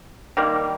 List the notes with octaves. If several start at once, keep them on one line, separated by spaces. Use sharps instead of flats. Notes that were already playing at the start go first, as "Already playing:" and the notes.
D#3 G3 A#3